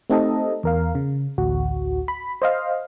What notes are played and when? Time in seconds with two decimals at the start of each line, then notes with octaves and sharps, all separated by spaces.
0.10 A3 C4 D#4 G4 A4 D#5
0.63 E2 A#4 F5
0.95 C#3
1.38 A1 D2 F#4
2.08 B5
2.42 C5 D#5 F5